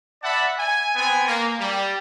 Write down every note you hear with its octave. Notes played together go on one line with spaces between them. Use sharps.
D5 E5 F#5 A5 B5
G#5
B3 C4 G#5
A#3
G3